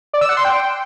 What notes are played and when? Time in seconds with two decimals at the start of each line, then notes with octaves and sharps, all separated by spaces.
0.13 D5
0.21 E6
0.29 F#5
0.37 C6
0.45 G5